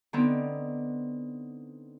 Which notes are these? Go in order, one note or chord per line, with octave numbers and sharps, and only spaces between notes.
D3 B3 C4 D#4